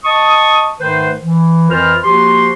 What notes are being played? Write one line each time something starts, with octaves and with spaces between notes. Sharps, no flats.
D#5 A5 C#6 D#6
G#2 D#3 A3 B4 C5
E3
F2 E3 F4 A#4 C5 F6
F3 A#3 F#4 G4 C6